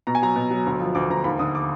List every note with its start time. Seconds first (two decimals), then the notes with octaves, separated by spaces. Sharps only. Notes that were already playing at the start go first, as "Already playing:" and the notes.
0.07 B2 A#5
0.15 G#5
0.22 F#3 A#5
0.36 B2
0.51 F#3
0.66 D2
0.80 F3
0.95 D2 D6
1.10 D2 A#5
1.24 D#2 B5
1.39 D3 D#6
1.55 D6